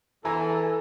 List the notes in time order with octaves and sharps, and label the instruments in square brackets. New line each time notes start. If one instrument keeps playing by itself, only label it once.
[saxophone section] E2 E3 [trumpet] A4 [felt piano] G#5 A#5